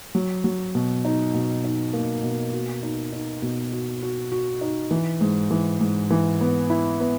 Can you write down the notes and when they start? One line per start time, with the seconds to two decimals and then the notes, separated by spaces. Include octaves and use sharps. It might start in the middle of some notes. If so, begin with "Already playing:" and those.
0.15 F#3
0.44 F#3
0.75 B2
1.05 D#4
1.34 B2
1.64 D#4
1.93 A#3
2.23 B2
2.53 F#4
2.83 D#4
3.12 D#4
3.42 B2
3.72 F#4
4.02 F#4
4.32 F#4
4.61 D#4
4.91 E3
5.21 G#2
5.51 E3
5.80 G#2
6.11 E3
6.41 B3
6.70 E4
7.00 B3